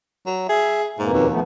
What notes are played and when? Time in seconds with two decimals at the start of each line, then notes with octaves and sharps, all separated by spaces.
0.26 F#3
0.49 G#4 E5
0.99 F2 G#2 B2 A#3
1.13 D#2
1.29 F3 A3 B3